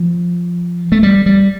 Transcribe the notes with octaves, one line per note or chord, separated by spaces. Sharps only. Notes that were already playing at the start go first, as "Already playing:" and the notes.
Already playing: F3
A3
G3
G3